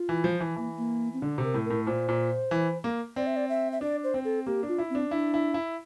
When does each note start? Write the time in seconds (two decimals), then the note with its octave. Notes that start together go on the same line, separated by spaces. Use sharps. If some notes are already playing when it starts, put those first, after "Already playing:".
Already playing: F4
0.09 E3
0.24 F3
0.40 E3
0.56 E3 A#3
0.78 A#3
1.14 C4
1.21 D3 D4
1.38 C3
1.44 A#4
1.54 A2
1.65 A#4
1.70 A2
1.86 A#2 C5
2.09 A#2
2.51 E3
2.84 A#3
3.16 C4 D5
3.27 E5
3.36 D5
3.49 E5
3.72 E5
3.81 D4 D5
4.04 C5
4.14 C4
4.25 A4
4.47 A#3 G4
4.63 D4
4.68 F4
4.78 E4
4.90 C4 D4
5.11 D4 E4
5.34 E4
5.54 E4